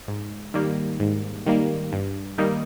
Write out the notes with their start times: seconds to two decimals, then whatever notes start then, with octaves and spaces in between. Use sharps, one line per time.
0.08 G#2
0.54 D#3 G3 A#3
1.00 G#2
1.46 D#3 G3 A#3
1.93 G2
2.38 D#3 G3 A#3 D#4